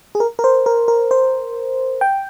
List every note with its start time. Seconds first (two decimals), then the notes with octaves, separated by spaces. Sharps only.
0.15 G#4
0.20 A#4
0.39 A#4
0.44 C5
0.66 A#4
0.88 A#4
1.11 C5
2.01 G5